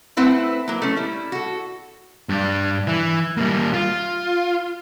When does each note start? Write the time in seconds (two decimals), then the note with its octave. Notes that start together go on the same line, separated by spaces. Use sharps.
0.17 A3 C4 E4 B4 F#5
0.68 F#3 A#3
0.82 A3 C#4
0.97 G3 E4
1.32 F#4 A4
2.29 G2 D4
2.87 E3
3.37 G3 A#3
3.74 F4